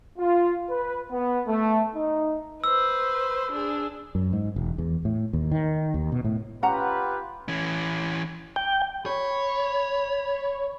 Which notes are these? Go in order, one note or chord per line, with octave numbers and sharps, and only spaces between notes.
F4
B4
B3
A3
D#4
B4 C5 E6
D4 G#4
F#2
G#2
E1
E2
A2
D#2
D#3
D#2
B2
A2
C#4 F4 G4 B4 F#5 A#5
E3 C#4
G5
C#5 B5